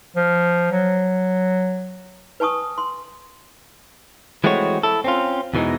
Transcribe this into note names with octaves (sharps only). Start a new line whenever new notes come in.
F3
F#3
B4 G#5 A5 C#6 D#6
C6
E3 G#3 A3 C4 F#4 C#5
E4 A4
C4 C#4 F4
E2 B2 E3 G#3 D#4